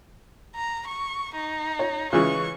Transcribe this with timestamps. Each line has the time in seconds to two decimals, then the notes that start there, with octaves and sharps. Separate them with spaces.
0.56 A#5
0.88 C#6
1.35 D#4
1.79 C#5
2.13 C#3 E3 G#3 C#6